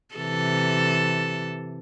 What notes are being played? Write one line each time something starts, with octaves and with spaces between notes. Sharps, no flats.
C3 E3 A4